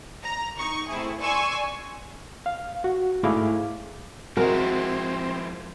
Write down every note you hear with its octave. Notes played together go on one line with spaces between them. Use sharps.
A#5
D#4 C#6
A3 C4 E4 G#4
D5 G#5 C6 C#6 E6
F5
F#4
G#2 A3 E4 G#4 F5 D6
F3 G#3 C4 E4 F#4 A#4